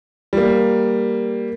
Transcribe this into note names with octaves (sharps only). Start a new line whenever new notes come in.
G3 A#3